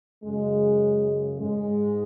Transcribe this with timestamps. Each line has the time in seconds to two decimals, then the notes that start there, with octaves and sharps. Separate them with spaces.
0.24 F#2 C#3 G#3
1.39 G#2 G#3